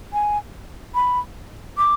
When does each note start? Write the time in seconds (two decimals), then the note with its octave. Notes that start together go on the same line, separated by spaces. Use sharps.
0.13 G#5
0.95 B5
1.78 D6